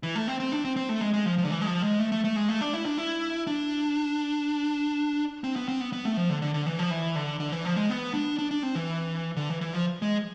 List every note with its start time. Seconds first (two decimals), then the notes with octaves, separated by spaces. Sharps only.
0.03 E3
0.15 A3
0.28 C4
0.40 C4
0.52 D4
0.65 C4
0.76 C4
0.89 A3
1.01 G#3
1.14 G#3
1.26 F3
1.38 F3
1.45 D3
1.51 E3
1.61 G#3
1.67 F3
1.83 G#3
1.99 A3
2.12 A3
2.24 A3
2.36 G#3
2.49 A3
2.61 D4
2.73 E4
2.85 D4
2.98 E4
3.47 D4
5.44 C4
5.56 B3
5.68 C4
5.81 B3
5.93 B3
6.05 A3
6.17 F3
6.30 D3
6.42 D3
6.54 D3
6.67 E3
6.79 F3
6.90 E3
7.15 D3
7.40 D3
7.52 E3
7.65 F3
7.77 G#3
7.90 B3
8.14 D4
8.38 D4
8.51 D4
8.63 C4
8.75 E3
9.36 D3
9.49 E3
9.61 E3
9.73 F3
10.02 G#3